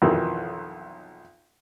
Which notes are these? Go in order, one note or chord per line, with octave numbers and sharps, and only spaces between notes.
B1 F2 D#3 E3 F#3